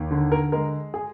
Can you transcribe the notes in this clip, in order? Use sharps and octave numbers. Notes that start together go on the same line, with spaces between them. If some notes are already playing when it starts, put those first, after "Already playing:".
Already playing: D#2
D3
A#4
G#3 A#4
G#4